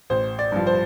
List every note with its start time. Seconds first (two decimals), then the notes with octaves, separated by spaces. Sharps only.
0.10 A1 C5
0.39 D5
0.52 G2 F3
0.67 C5